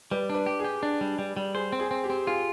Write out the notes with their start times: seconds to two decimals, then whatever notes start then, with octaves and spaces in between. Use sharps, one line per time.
0.11 G3 B4
0.30 D4 B4
0.46 G4
0.59 G#4
0.64 G4
0.83 D4
1.01 G3
1.19 G3
1.37 G3
1.54 G#4 C5
1.72 C4
1.79 G#4
1.91 C4
2.04 G4
2.10 C4
2.27 F4 G#4